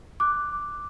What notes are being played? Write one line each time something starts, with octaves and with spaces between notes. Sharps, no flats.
D6 F#6